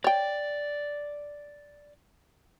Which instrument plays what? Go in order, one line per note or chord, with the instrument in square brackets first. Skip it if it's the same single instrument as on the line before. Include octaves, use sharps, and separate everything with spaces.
[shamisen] C#5 G5 [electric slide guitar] D5